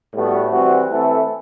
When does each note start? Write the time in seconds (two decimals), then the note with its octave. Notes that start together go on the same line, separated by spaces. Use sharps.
0.14 A2 G3 B3 F#4
0.51 E3 G3 C4 F#4
0.89 E3 A3 C4 E4 A4